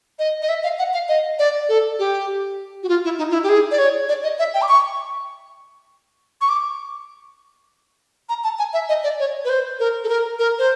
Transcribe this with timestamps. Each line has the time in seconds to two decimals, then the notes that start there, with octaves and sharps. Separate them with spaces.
0.19 D#5
0.42 D#5
0.49 E5
0.64 F5
0.79 F#5
0.94 F5
1.09 D#5
1.39 D5
1.69 A4
1.99 G4
2.83 F#4
2.89 F4
3.04 E4
3.18 D#4
3.30 F4
3.34 E4
3.44 G4
3.49 G#4
3.71 D5
3.79 C#5
4.09 D5
4.24 D#5
4.39 E5
4.54 G5
4.62 D6
4.69 C#6
6.41 C#6
6.49 D6
8.29 A#5
8.44 A5
8.59 G#5
8.73 E5
8.89 D#5
9.04 D5
9.19 C#5
9.45 B4
9.49 C5
9.79 A#4
10.04 A4
10.09 A#4
10.39 A#4
10.59 C5